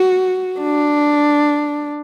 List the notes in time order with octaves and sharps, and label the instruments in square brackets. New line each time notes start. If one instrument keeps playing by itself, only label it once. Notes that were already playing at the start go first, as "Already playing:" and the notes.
Already playing: [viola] F#4
D4